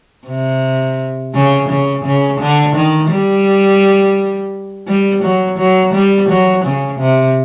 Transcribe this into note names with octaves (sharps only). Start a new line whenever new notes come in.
C3
C#3
C#3
C#3
D3
D#3
G3
G3
F#3
F#3
G3
F#3
C#3
C3